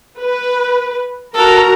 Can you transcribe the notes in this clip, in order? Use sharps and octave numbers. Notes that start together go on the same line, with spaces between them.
B4
F#4 A4 A#4 A#5